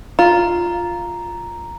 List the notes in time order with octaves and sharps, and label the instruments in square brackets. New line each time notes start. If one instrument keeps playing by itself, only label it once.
[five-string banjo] F4 [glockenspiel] A#5